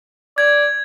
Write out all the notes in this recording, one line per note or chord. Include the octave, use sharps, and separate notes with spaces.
D5 G#6